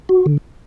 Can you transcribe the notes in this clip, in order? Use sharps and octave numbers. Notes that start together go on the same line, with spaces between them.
F#4
D3